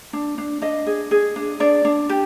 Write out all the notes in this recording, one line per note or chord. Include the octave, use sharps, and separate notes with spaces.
D4
D4
D4 D#5
G#4
G#4
D4
D4 D5
D4
G4